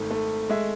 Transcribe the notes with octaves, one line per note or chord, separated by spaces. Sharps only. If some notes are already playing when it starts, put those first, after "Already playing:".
Already playing: G#1 G#2 A3
A3
G#3 E5